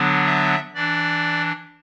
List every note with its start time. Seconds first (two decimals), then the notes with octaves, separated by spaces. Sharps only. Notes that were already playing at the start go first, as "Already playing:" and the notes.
Already playing: D3 F#3 B3 D4
0.26 E5
0.74 E3 D4 D5